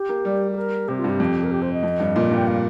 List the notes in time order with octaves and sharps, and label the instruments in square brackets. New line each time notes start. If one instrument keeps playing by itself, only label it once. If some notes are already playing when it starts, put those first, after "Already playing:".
Already playing: [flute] G4
[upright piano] A#3
G3
[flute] G4
A#4
[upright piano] C3 [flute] G4
[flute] F4
[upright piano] G2
[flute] G4
[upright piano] F2
[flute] A#4
G4
C5
D#5
[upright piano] F2
G2
A#2
G2
[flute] G5
F5